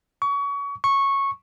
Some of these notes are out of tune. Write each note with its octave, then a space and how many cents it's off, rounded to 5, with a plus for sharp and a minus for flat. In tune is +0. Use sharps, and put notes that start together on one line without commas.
C#6 +30
C#6 -10